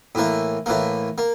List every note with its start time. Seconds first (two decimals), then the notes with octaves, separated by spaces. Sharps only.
0.15 A2 E3 A#3
0.66 A2 E3 A#3
1.18 A#3